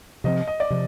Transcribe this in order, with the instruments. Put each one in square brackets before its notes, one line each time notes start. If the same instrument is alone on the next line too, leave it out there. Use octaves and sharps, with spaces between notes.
[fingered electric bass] C3 F3 C4 [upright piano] D#5
[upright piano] D#5
D5
[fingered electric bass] C3 F3